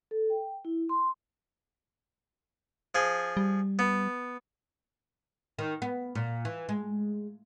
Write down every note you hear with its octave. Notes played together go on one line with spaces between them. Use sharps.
A4
G5
E4
C6
F3 G#4
G3
B3
D#3
B3
A#2
E3
G#3